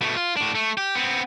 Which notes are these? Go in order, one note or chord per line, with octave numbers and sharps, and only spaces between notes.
B2 A3
F4
A2 D4
A3
G4
B3 C4